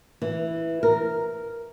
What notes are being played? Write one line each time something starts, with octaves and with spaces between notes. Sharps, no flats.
E3
A#4